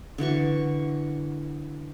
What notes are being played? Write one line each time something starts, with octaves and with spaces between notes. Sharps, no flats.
D3 E3 F#4 C#6